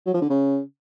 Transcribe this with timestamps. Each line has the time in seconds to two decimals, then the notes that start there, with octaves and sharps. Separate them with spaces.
0.06 F#3
0.14 F3
0.22 D3
0.30 C#3